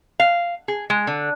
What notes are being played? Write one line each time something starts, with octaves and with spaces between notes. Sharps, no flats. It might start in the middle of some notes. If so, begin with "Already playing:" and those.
F5
G#4
G#3
D3